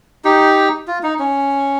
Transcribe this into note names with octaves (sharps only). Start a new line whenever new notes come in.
D#4 G4
F4
D#4
C#4